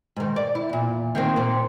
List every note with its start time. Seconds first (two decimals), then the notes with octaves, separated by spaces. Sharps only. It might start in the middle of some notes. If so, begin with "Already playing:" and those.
0.16 G#2 D#3
0.36 D5
0.55 E4
0.69 E2 A#2
1.15 D#3 A#3 C4
1.36 A#2 C4